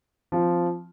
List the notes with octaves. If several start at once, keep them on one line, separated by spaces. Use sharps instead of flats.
F3 C4 F4